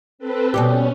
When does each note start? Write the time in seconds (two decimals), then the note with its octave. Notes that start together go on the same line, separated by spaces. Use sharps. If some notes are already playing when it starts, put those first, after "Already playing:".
0.19 C4 A4 B4
0.54 B2 G3 C#4 G4